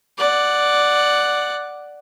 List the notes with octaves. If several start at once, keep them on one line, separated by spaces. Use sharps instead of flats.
D5 F#5